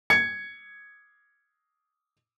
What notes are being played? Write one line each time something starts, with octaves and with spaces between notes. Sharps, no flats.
G#6 C#7